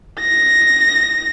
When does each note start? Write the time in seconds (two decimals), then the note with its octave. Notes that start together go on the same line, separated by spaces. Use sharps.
0.19 A#6